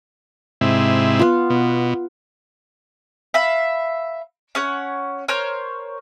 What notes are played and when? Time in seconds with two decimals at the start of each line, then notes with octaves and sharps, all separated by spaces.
0.61 G#2 C3 E4
1.19 B3 F4
1.50 B2
3.34 E5 F5 B5
4.55 C#4 C#5 F#5
5.28 A#4 C5 C#5 F6